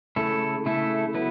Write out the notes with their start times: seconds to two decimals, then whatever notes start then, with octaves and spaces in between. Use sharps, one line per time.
0.16 C#3 A3 E4 A4
0.66 C#3 A3 E4 A4
1.14 F#3 B3 E4 B4